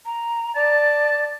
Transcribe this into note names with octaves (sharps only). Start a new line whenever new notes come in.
A#5
D5 A5